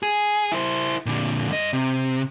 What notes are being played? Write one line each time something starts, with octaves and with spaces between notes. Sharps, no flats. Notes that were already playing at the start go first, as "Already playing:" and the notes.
G#4
E4 C5
A#2 D3
G2 D#5
C3